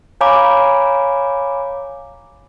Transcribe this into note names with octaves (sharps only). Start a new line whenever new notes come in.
C#5 F5 G#5 A#5 B5 D6